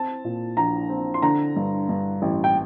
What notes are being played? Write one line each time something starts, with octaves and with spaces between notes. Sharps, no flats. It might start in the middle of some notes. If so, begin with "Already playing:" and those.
Already playing: C4 A5
A#2
A#1 A#5
C4
C6
D3 A#5
G2
G2
A1
G5